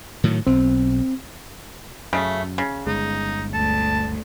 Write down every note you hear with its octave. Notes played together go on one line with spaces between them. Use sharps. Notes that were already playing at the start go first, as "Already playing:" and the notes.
A2 D#3 F#3
B1 C4
F#2 C#3 A3
C#3
G1 G#3 D#4
D2 A5